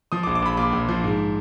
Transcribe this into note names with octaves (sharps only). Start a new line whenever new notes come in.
F3 D#6
D6
A#1
D6
A#1 B5
A#2 D6
A#1
F3
G#2